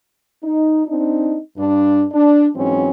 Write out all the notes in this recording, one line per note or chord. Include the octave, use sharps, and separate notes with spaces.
D#4
C4 D4 D#4
G2 D4
D4
G#2 E3 F#3 C4 C#4